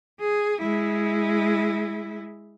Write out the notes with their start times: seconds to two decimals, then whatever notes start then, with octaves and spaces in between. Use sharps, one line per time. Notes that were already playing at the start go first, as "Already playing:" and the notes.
0.20 G#4
0.62 G#3 E4